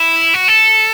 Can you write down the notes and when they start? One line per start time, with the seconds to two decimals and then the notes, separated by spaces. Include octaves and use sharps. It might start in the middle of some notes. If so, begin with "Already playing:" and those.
Already playing: E4
0.34 F#4
0.48 A4